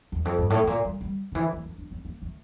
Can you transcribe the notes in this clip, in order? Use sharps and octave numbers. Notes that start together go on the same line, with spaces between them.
E2
F2
G2
A2
A2
A#2
G3
G3
D3
E3
A#3
D4
D4
C4
A#3
A3